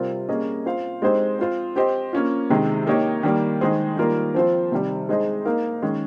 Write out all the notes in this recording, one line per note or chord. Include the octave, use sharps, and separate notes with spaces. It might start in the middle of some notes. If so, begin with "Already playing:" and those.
Already playing: C3 G3 C4 F4 A#4
G3 A#3 C#4 G#4 D#5
C4 F4 C5 F5
G#3 C4 D#4 G4 C5
C4 F4 C5
C4 G4 C5 D#5
A#3 C#4 F4
C3 D#3 G#3
A#3 D#4 G4 C#5
D#3 G3 A#3
D#3 G#3 D#4 G#4 C5
D#3 G3 A#3 F4 A#4
F3 C4 F4 C5
C3 D#3 G3
G#3 D#4 G#4 C5 D#5
A#3 D#4 A#4 F5
D#3 G#3 C#4 G#4